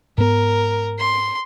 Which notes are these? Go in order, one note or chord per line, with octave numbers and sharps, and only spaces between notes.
G#2 B3 A#4
C6